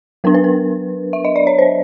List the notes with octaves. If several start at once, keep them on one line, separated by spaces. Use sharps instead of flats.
F#3 B3 D4 A#4
B4
A#4
E5
D#5
D5
C#5
C5